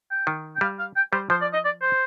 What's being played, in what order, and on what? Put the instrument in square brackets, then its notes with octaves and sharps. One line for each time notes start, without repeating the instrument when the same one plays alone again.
[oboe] G5
[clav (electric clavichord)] D#3
[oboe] G5
[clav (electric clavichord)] G3 [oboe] F5
[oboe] F5
G5
[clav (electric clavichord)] G3 [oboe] C5
[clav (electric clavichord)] F3 [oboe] C5
[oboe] D5
D#5
D5
C5